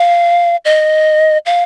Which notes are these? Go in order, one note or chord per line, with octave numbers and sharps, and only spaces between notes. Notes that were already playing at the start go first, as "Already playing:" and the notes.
Already playing: F5
D#5
F5